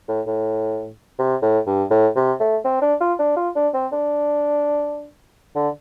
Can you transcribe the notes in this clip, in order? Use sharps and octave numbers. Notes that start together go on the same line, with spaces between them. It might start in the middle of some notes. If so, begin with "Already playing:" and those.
A2
A2
C3
A2
G2
A2
C3
A3
C4
D4
F4
D4
F4
D4
C4
D4
D3